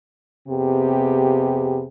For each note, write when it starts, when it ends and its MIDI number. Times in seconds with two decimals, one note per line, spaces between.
0.48 1.85 41
0.48 1.85 48
0.48 1.85 59
0.48 1.85 67
0.48 1.85 68